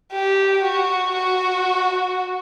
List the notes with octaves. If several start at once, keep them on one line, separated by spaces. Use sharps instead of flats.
G4
F#4
F#4